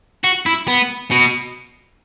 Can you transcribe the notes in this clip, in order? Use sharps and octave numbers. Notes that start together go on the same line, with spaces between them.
F#4
E4
B3
B2